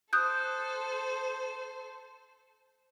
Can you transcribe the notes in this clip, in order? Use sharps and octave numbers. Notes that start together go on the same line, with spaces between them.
A4 C5 D#6 F#6 G6